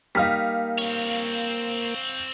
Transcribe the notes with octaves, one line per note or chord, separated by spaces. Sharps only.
G3 A#3 D#4 F5 F6 B6
C4 C#5